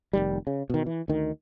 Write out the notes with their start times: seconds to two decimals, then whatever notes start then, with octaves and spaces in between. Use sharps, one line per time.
0.13 F1 D#3 G3
0.47 C#3
0.70 B2 D#3
0.86 E3
1.08 D2 D#3